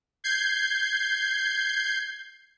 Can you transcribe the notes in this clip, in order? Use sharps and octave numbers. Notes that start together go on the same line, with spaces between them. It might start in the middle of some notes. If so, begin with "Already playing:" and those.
G6 G#6 C7